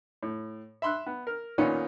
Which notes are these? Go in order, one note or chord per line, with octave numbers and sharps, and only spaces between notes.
A2
E5 B5 C6 E6 F#6
B3
A#4
A#2 D#3 B3 C#4 D#4 F4